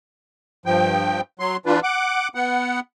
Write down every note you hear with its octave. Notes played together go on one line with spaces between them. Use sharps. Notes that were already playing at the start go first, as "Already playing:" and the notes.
G2 F3 G5
F#3 C6
E3 D4 F4 B4
F#5 D6
B3 F#5